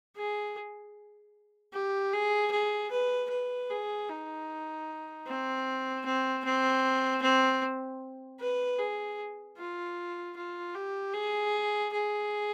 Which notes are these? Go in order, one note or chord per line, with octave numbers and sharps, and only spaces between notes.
G#4
G4
G#4
G#4
B4
B4
G#4
D#4
C4
C4
C4
C4
B4
G#4
F4
F4
G4
G#4
G#4